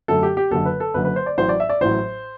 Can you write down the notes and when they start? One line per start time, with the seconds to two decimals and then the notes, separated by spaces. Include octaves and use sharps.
0.08 F#2 D3 A3 A4
0.23 G4
0.37 G4
0.51 F#1 F#2 D3 A4
0.65 B4
0.80 A4
0.94 F#1 F#2 D3 B4
1.05 B4
1.16 C5
1.26 D5
1.38 A1 A2 F#3 C5
1.49 D5
1.60 E5
1.69 D5
1.81 A1 A2 F#3 C5